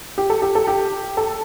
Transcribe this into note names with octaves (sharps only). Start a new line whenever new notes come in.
G4
A4
G4
A4
G4
A4